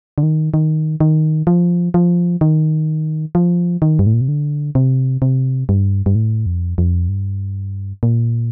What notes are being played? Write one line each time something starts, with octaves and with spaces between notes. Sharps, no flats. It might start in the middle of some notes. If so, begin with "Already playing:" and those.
D3
D#3
D#3
D#3
F3
F3
D#3
F3
D#3
G2
A2
A#2
C3
D3
C3
C3
G2
G2
A2
F2
F2
G2
A#2